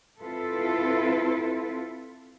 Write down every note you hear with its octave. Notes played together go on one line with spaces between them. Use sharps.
C4 E4 F4 A4 B4